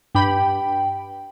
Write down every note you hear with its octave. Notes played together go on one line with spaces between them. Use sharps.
G2 G4 G5 B5